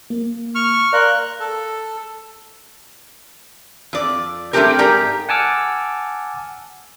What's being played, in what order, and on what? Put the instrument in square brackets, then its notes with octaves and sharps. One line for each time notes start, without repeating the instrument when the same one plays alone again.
[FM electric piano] A#3
[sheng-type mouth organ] C#6 F6
[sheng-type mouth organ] A#4 [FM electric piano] D5 F5 C6 [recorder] F#6
[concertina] A4
[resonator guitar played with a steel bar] F2 D5
G3 A3 C4 D4 G4 A#4
G#2 G4 A#4 D5 A#5
[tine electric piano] F#5 G#5 A5 D6 E6 F6